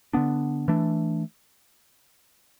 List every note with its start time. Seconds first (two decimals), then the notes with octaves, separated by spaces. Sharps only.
0.13 D3 B3 D4
0.68 E3 A3 D4